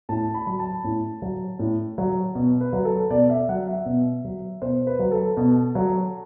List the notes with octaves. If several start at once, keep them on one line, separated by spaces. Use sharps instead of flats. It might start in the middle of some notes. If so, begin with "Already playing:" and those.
A2 A5
B5
F#3 B5
A5
A2
F#3
A2
F#3
B2
B4
F#3
A4
B2 D5
E5
F#3 F#5
E5
B2
F#3
B2 C5
B4
F#3
A4
B2
F#3